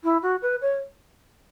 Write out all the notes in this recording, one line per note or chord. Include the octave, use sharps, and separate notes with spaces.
E4
F#4
B4
C#5